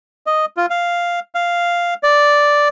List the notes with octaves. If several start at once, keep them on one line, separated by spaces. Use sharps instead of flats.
D#5
F4
F5
F5
D5